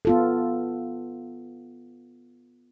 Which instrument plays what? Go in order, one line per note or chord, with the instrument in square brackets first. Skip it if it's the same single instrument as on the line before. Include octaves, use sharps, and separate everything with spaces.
[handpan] B3 F4 A4